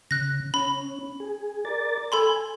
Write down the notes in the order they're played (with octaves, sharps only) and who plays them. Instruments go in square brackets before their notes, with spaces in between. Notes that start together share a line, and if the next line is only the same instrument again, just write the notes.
[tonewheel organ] C#3 [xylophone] F#6 A#6
[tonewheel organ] C#4 [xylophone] B5
[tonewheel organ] G#4
A#4 D5 A6
[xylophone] A4 B5 C6 [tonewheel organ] G#5